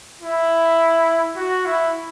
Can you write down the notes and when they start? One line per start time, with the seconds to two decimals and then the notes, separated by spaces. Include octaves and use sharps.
0.21 E4
1.36 F#4
1.66 E4